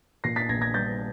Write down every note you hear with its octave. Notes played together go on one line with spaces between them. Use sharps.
A#2 A#6 C7
A6 B6
A#1 G#6 A#6
G#6 A#6
G3 G6 A6